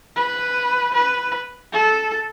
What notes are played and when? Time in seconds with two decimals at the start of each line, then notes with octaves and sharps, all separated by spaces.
0.16 B4
0.94 B4
1.73 A4